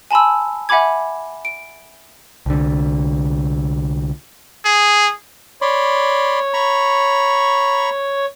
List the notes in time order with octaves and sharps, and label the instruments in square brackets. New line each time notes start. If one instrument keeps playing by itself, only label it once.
[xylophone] G#5 A5 B5 C6 E6
E5 F#5 G#5 B5 D6 G#6
D7
[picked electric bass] C2 D3
[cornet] G#4
[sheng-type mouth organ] C#5 [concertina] D5 B5 C6
[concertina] A#5 B5 C#6